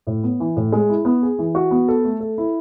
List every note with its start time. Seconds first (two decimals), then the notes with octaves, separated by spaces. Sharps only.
0.07 A2
0.23 B3
0.40 E3
0.56 A2
0.72 G#3
0.89 E4
1.05 B3
1.22 G#4
1.39 E3
1.55 F#4
1.71 B3
1.88 A4
2.05 A3
2.20 A4
2.38 E4